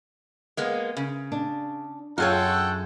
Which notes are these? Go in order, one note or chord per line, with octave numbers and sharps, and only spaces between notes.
G#3 A#3 B3
C#3
D4
F#2 F4 G#4 A4 C#5 F#5 G5